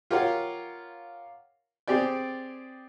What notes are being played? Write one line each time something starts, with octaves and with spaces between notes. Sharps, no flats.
F4 G4 A#4 C#5 F5 F#5
C4 G4 G#4 D5